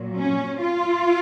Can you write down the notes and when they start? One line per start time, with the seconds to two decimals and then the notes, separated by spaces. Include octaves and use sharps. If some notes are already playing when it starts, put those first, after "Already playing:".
Already playing: A#2 F#3
0.16 C#4
0.62 F4